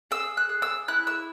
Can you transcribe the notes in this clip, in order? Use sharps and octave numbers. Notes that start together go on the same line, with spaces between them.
G#4 E6
F#6
G#4
E6
E4 F#6
E6